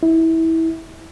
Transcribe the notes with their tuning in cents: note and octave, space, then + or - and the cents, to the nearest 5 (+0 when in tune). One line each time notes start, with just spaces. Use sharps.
E4 -20